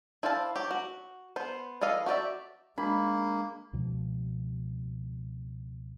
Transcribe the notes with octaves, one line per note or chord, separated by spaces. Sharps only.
E4 C5 D5 F5 A5
F#3 G4
F#4
B3 C5
E3 A4 D#5 F5
F#4 G4 B4 D5 E5
G#3 A#3 D4 B5
C#2 B2 F3